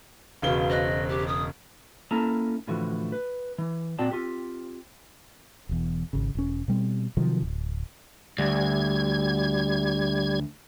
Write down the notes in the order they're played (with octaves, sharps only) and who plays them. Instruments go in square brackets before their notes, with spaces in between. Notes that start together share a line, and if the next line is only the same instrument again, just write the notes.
[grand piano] E1 C#3 G7 [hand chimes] F#4 B4 F5
[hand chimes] C5 F#6 [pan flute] D#5
[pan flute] G4
D#6
[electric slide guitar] A#3 C#4 E4 A4 A5 A#5
A2 D3 E3 F3 F#4
B4
E3
A#2 C4 F#4 D5 G5 A5
C4 F4 G4
[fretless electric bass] E1 E2
G#1 C#3
E1 C#4
B2 G3 C4
C3 D#3 F3 F#3
D1
[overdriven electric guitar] D2 [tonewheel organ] G3 G#6